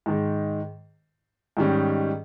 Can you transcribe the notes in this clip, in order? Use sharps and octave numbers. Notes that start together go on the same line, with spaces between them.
G#2 D#3 G#3
G#2 D#3 G3 C#4